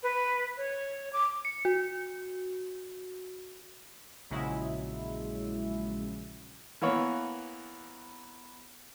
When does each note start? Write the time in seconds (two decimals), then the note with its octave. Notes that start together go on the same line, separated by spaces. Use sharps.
0.03 B4
0.57 C#5
1.13 D6
1.45 C#7
1.65 F#4
4.30 A#1 C#3 F#3 G#3 E4
6.81 E3 A#3 B3 C#5